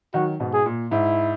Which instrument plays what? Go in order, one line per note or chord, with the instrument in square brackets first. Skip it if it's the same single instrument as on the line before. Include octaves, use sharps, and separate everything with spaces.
[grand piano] D#3 F#3 [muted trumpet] F#4
[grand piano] G#2 B2
[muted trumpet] G#4
[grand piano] A#2
[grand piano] G#2 [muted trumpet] E4